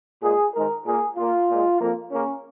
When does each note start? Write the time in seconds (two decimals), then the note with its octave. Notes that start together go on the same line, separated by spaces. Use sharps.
0.22 A#2 G#3 G#4
0.54 G#2 D#3 G#3 A#4
0.85 A#2 A#3 G#4
1.17 A#2 A#3 F4
1.49 A#2 G#3
1.80 F2 F3 A#3
2.11 C#3 A#3 C#4